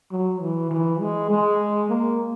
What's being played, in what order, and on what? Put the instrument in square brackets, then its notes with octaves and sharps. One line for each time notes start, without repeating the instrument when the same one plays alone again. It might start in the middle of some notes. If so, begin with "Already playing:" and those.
[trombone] F#3
E3
E3
G#3
G#3
A#3